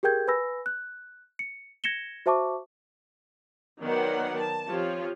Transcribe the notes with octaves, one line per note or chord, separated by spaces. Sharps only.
G4 G#4 A#4 G5 G6 G#6
B4 G#5 B5 E6 A#6
F#6
C#7
G#6 A#6 C#7 E7 G7
F#4 C5 E5 A5 C#6 D6
D#3 F#3 B3 A#4 D5 F#5
A5
F3 C4 F4 G4 C#5